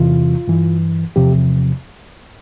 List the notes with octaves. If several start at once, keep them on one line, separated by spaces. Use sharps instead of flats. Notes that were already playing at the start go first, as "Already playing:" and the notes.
Already playing: E2 C3 E3 F4
G2 E3
E2 C3 F3 G4